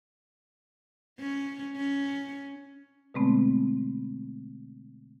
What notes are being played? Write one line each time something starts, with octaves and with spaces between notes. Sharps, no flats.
C#4
C#4
B2 D3 G#3 A3 B3 C4